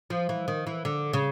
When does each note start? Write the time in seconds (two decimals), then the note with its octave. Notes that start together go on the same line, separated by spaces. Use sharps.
0.10 F3
0.29 E3
0.48 D#3
0.67 E3
0.85 D3
1.13 C#3